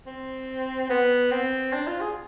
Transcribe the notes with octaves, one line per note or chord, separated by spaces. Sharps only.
C4
B3
C4
D4
F4
G#4